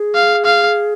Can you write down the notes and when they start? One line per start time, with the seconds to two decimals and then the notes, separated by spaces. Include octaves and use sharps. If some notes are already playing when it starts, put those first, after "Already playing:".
Already playing: G#4
0.15 F5
0.45 F5